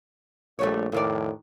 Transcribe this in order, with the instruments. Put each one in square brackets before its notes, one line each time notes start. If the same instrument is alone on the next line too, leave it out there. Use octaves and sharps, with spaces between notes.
[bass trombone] A#1 [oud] G3 A3 C#5
[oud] F2 D#3 D5 [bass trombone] A2